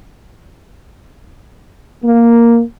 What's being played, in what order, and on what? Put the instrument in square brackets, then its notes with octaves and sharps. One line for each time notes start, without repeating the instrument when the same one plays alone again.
[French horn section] A#3